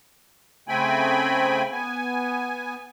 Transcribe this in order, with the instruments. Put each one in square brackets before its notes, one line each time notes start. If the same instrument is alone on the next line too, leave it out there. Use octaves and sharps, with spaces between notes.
[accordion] C#3 A3 C4 G5 G#5 B5
B3 G#5